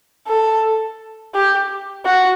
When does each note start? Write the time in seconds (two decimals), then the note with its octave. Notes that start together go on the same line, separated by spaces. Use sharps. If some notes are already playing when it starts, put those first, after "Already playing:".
0.27 A4
1.35 G4
2.05 F#4